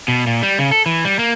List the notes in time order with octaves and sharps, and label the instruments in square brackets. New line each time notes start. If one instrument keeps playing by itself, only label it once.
[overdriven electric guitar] B2
A#2
G3
C#3
A4
E3
G3
A#3